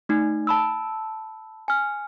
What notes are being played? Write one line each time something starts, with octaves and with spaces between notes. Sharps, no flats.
A3 D#4
A5 B5 E6
G#5 F6